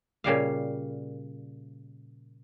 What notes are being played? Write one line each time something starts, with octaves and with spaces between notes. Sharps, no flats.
A#2 C#3 G3 F5